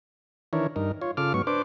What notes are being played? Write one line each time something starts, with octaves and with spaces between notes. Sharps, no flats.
D#3 E3 D4 E4 A#4 C#5
G2 D#4 A#4
F4 C#5
C#3 F4 A4 D6 F6
G#2 F#3 B3 C#6
D4 B4 C5 D6